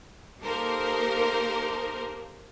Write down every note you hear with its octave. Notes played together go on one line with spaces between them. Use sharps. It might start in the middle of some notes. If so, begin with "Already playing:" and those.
A#3 D#4 G4 A4 A#4 C5